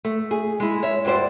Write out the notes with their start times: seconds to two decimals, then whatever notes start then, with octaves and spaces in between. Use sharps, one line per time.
0.05 A3
0.31 G#4
0.60 G#3 E4
0.83 C#5 E5
1.05 G2 F#4 C5 D5